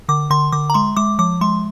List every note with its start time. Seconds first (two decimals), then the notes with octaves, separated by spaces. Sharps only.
0.09 D3 D6
0.30 D3 C6
0.52 D3 D6
0.70 A#5
0.74 G#3 C6
0.97 G#3 D6
1.19 F3 D6
1.41 G#3 C6